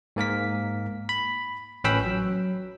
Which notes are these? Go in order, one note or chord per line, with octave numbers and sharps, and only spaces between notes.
G#2 A#3 A#4 B6
B5
A1 C#4 B4 G5 B5 E6
F#3